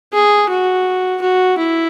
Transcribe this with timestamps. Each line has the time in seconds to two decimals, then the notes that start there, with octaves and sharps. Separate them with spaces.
0.13 G#4
0.50 F#4
1.21 F#4
1.58 E4